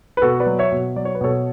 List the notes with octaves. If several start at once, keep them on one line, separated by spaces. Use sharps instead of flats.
B4
B2 F#4 A4
B4 D5
F#3
C#5 E5
B2
F#3 D5
C#5
B4
B2 A4 C#5